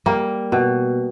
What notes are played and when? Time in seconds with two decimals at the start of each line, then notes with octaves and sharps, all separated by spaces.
0.06 G3 A#3
0.52 B2